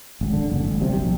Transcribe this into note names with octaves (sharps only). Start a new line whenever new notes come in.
D1 G#1
D3
F#1
G#1
D1 B1 C3 G3
A#1